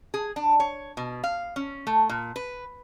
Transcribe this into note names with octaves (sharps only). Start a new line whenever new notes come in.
G#4
D4
C#5
B2
F5
C#4
A3
A#2
B4